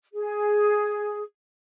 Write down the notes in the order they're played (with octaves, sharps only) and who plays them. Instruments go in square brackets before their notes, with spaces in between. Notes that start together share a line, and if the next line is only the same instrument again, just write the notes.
[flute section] G#4